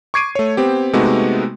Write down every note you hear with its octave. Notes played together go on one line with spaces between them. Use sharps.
C#6 D6 G#6 C7 D7 D#7
A3 C#5
B3 C4 G4
C3 G#3 A3 B3 D#4 F#4